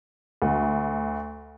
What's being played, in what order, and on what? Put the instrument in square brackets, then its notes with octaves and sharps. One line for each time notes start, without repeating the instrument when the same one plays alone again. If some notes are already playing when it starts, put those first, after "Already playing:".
[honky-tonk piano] D2